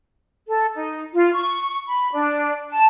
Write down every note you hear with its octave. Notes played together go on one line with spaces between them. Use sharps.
A4
D#4
F4
C#6
B5
D4
A5